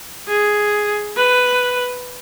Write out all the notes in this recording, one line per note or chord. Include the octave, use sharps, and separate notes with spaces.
G#4
B4